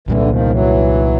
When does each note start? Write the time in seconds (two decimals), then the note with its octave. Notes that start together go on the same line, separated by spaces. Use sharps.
0.08 C2 A#2 D3 E3 G3 A#3
0.29 D#3 F3
0.49 E3 F#3